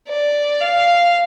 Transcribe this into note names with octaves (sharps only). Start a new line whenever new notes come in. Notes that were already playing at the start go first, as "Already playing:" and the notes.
D5
F5